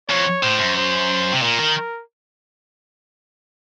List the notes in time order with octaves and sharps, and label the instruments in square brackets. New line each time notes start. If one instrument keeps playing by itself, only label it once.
[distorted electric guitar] F2 [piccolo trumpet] C#5
[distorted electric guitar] A2 [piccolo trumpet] C5
[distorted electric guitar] F#2
[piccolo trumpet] C5
[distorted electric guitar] C3
[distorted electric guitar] A#2 [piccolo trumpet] A#4
[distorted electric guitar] D#3